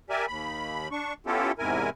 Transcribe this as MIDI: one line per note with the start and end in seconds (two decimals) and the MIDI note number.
0.10 0.26 67
0.10 0.26 70
0.10 0.26 74
0.10 0.26 76
0.10 0.26 80
0.28 0.88 39
0.28 0.88 83
0.91 1.14 62
0.91 1.14 85
1.26 1.52 59
1.26 1.52 61
1.26 1.52 64
1.26 1.52 65
1.26 1.52 67
1.26 1.52 69
1.59 1.90 40
1.59 1.90 44
1.59 1.90 48
1.59 1.90 64
1.59 1.90 70
1.59 1.90 80